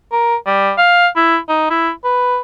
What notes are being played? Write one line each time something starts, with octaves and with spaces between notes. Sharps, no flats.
A#4
G3
F5
E4
D#4
E4
B4